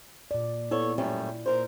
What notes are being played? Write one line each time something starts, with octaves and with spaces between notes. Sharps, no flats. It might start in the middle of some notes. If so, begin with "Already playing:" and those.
A#2 D5
B3 E4 A4 C#5 D5
F#2 A2 G3
A#2 A#4 C5